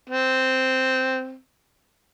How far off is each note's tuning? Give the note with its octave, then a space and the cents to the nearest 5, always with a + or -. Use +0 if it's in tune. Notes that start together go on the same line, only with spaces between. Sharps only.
C4 -5